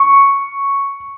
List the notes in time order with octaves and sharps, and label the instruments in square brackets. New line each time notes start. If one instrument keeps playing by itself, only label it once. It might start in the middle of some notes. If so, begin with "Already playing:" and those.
Already playing: [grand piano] C#6